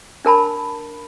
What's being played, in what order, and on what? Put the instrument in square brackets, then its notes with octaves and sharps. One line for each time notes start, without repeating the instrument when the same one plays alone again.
[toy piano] D4 A#4 A5 B5